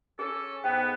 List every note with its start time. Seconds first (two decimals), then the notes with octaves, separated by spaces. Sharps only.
0.19 C#4 G#4 A4
0.64 G#2 B3 G5